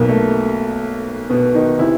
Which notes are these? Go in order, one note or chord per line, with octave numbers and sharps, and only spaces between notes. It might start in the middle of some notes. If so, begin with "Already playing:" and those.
Already playing: B1 B2 A#3
A3
B2 B3
D#3 D#4
C3 E3 E4